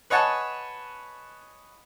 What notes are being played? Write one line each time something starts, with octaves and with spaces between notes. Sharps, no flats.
B4 C#5 D#5 F#5 G#5 A5